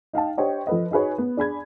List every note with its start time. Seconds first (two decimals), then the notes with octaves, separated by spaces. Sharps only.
0.13 D#4 F5 G5 A5
0.37 D4 G4 C5 C#5 D#5 G5
0.67 F3 A4 B4 D#5
0.91 D#4 F#4 G#4 B4 C#5
1.18 B3
1.37 D4 G#4 B5 G#6